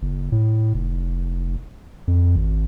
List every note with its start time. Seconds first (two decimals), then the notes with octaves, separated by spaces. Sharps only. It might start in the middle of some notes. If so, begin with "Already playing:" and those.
0.02 F#1
0.32 A2
0.74 F1
2.07 F2
2.36 G#1